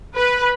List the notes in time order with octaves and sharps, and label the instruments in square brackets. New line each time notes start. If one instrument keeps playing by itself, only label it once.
[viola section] B4